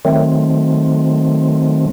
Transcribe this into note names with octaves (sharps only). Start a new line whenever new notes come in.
D#3 F#3 A3 C4